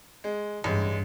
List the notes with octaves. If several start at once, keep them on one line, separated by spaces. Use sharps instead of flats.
G#3
A1 G2 G#3